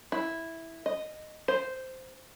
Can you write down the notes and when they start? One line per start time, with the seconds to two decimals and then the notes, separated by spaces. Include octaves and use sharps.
0.12 E4
0.86 D#5
1.48 C5